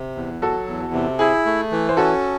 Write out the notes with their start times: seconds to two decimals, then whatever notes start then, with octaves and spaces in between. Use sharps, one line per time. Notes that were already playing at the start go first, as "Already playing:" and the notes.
Already playing: C3
0.15 E2
0.41 F#3 F#4 A4
0.67 E2
0.93 C3
1.19 E4 G#4
1.46 A3
1.72 E3
1.89 C5
1.97 C#4 F#4 A4